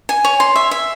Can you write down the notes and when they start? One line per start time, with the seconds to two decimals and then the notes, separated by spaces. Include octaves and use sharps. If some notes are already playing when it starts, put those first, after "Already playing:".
0.09 G#5
0.25 C#5
0.40 C6
0.56 E5
0.71 E5